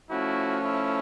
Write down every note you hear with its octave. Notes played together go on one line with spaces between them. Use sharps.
F3 A3 C#4 E4 F#4
E4